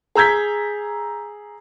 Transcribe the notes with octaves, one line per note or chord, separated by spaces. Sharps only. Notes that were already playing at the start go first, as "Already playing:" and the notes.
G#4 A#5 E6 G6 G#6 B6